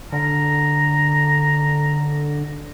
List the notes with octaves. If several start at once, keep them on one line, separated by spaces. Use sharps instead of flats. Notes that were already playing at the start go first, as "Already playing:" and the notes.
D3 A#5